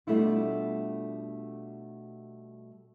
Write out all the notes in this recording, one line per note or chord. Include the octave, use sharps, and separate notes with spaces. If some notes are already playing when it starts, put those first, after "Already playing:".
B2 G3 A3 D4 E4 F4